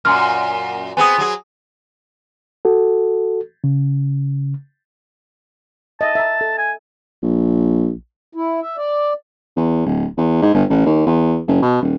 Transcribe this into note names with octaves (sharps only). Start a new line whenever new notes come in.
F#2 A#2 G#5 C6 F6
B3 C4 G#4 G#5 D#6
F#3 G#4
F#4 A4
C#3
D#5 E5 A5
E5 A#5
A4
G#5
A#1
E4
E5
D5
E2
D1
E2
G#2
G1
A1
D#2
E2
F#1
B2
D#1